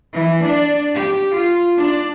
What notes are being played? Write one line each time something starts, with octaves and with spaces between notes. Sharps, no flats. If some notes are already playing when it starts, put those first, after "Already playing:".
E3
D4
G4
F4
D4